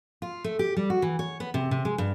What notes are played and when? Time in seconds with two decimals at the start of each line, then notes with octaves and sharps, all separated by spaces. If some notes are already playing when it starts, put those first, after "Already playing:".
0.22 F4
0.44 A3
0.59 G4
0.76 G3
0.90 F#4
1.02 E3
1.19 C#5
1.40 B3
1.54 C3
1.71 C3
1.85 G#3
1.98 G2